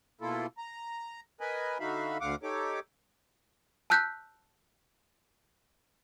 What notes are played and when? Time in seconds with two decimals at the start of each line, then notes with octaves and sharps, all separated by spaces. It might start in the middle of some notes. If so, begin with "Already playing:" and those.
0.21 B2 A#3 E4 F4 A4
0.58 A#5
1.41 A#4 B4 D#5 G#5 B5
1.80 D3 D#4 F#4 E5 F5 B5
2.21 D2 D3 F5 F#5 D6
2.43 D#4 G4 A4 C#5 D6
3.90 A5 E6 F#6 G6 B6